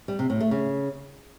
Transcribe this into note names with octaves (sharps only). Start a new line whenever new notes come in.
G3
C3
A2
A3
C#3